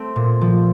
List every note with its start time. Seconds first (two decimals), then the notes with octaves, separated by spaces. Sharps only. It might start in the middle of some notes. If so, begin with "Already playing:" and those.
Already playing: A3 C4
0.16 A#2
0.41 F3